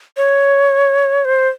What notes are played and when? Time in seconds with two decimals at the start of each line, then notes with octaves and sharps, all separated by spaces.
0.17 C#5
1.25 C5